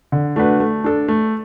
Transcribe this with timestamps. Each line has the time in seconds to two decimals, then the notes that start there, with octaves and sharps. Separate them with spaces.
0.12 D3
0.36 A3 D4 F#4 B4
0.60 A3
0.84 D4 A4
1.08 A3